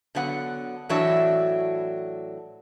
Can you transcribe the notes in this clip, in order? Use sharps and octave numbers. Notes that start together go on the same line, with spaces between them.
D3 F#3 B3 F#5
A2 E3 F#3 D4 F#4 E5